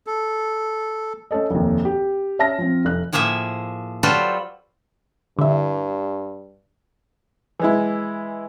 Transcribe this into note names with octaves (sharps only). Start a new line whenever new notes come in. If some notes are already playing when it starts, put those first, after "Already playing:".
A4
A3 C#4 A4 D#5
F1 D#2
G4
C#4 E5 A5 F6 A#6
F3 C4
F1 F#6
A2 F3 A#3 G#4 E5
F#3 G3 F4 A4 B4 C5
G2 D3 E4
E3 G#3 E4